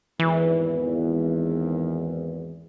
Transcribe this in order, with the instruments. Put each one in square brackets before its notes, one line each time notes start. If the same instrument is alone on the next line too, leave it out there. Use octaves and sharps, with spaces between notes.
[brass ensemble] G#1 E2 [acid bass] E3